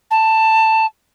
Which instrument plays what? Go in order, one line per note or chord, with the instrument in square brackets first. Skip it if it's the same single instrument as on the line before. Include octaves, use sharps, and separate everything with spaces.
[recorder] A5